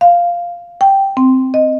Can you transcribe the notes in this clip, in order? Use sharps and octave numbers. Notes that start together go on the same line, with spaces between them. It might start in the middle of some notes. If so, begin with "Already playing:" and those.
F5
G5
C4
D#5